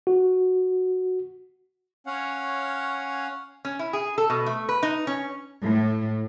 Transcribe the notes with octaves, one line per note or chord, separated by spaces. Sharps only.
F#4
C#4 C#5 F5 F#5
C#4
E4
G#4
A4
B2
A3
B4
D#4
C#4
A2